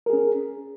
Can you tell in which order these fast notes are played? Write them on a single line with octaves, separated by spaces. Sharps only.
A#4 G#4 C#4